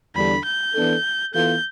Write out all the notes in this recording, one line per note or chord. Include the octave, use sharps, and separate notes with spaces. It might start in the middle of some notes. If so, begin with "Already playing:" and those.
E2 D3 G3 D4 G4 B5
G6
E3 B3 D4 A4
E3 B3 F4 A4 G6